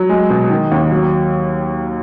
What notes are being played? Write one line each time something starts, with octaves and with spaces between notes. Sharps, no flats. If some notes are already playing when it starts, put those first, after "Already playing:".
Already playing: F#3
G#3
B2
D#3
D#2
F#3